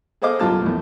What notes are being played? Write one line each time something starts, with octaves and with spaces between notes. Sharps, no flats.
G#4 A4 C5 D#5 F5 D6
B1 F#2 G3 F4 A5 F6
A#1 E2 A2